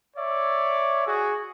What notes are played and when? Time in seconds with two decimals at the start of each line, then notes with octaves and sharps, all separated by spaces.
0.17 C#5 D5 E5
1.07 F#4 G#4